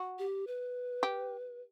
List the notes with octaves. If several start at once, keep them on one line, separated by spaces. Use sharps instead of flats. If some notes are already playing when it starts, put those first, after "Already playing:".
Already playing: F#4
G4
B4
G4